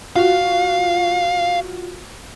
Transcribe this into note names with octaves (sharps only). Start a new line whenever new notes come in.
F4 F#4 F5